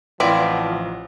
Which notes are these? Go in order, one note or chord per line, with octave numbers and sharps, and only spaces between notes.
A1 F3 C4 E4 B4 D5 F5 F#5